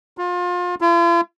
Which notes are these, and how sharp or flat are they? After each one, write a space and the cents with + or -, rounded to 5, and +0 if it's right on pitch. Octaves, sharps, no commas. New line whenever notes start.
F4 +30
F4 -45